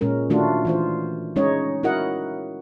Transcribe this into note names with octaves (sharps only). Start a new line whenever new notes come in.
A#2 G#3 C#4 A#4
D#3 A3 D4 F4 F#4
E3 F4 C5
G#3 C#4 D#4 C#5 D#5
E4 F#4 A#4 D#5 F#5